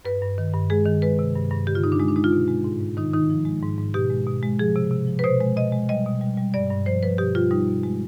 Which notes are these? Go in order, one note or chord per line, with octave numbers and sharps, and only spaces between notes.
G2 B4
G2
D#3
G2
G#3 G#4
D#3
G#3 B4
C3
G2
G2
D3 G4
F4
G2 D#4
D4
G#3 D#4
D4
G#3 D#4
F4
B2
G#3
G#2
G#2
D#3 D#4
D#3 D#4
F3
G#3
G#2
G#2
B2 G4
G#3
B2
G#3
F3 G#4
C3
C3
F3
B4
B2 C5
G#3
B2 D#5
G#3
G3 D#5
B2
G3
G3
G2 D5
G2
F3 C5
F3 B4
B2 G4
G3 F4
G3 D#4
B2
G#3